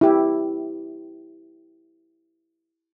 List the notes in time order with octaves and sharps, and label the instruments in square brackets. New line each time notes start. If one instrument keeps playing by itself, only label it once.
[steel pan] E4 G4